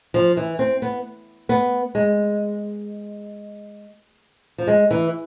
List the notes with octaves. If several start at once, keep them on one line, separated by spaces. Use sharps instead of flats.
F3
E3
C4
B3
B3
G#3
F3
G#3
E3